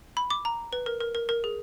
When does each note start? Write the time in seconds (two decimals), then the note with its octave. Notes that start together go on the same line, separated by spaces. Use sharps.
0.17 B5
0.30 D6
0.45 A#5
0.73 B4
0.86 A#4
1.00 A#4
1.15 A#4
1.29 A#4
1.44 G#4